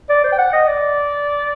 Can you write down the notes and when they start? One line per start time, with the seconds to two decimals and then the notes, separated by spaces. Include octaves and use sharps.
0.09 D5
0.24 C5
0.32 G5
0.38 F#5
0.53 D#5
0.67 D5